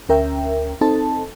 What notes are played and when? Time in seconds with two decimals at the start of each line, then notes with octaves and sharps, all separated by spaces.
0.09 D2 C#4 A#4 E5 G5
0.81 C4 D#4 A4 A5